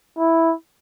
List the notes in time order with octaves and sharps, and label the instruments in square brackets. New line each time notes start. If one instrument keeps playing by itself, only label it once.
[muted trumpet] E4